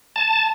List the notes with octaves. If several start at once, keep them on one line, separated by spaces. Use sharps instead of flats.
A5